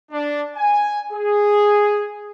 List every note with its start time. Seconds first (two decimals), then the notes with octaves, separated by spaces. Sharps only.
0.12 D4
0.56 G#5
1.13 G#4